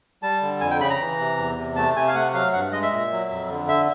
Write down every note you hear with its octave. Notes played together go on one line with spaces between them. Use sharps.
G3 A5
D3
F2 G#5
G5
C#3 B5
A#5
E3
C3
E2
C3
A3 A5
C3 G#5
F5
A3 F#5
F#3 F5
G2 F#5
G#3 D#5
E5
A#2
F#3
F2
D3
E5